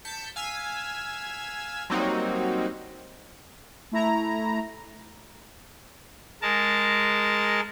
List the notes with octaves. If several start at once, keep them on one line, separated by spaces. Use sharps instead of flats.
A5 G6 B6 C#7
F5 G#5 E6 G#6 B6
F#3 G3 A#3 C4 D#4 F#4
A3 E4 A#5
G#3 A#4 A5